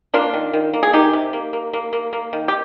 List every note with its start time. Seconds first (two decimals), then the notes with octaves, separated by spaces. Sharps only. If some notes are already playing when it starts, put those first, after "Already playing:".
0.14 A#3 D4 F4
0.34 D#3
0.53 D#3
0.73 A#3
0.83 G#4
0.93 D#3 D#4 G4
1.13 C3
1.33 A#3
1.53 A#3
1.73 A#3
1.93 A#3
2.13 A#3
2.33 D#3
2.48 G4